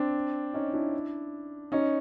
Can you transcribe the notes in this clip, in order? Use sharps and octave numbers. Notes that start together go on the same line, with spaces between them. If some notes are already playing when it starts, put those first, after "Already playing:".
Already playing: C4 D4
C#4 D#4
D4 E4
C#4 D#4